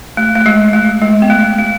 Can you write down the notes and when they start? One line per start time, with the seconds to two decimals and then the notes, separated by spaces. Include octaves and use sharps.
0.17 A3
0.35 A3
0.46 G#3
0.73 A3
1.02 G#3
1.22 B3
1.30 A3
1.58 A3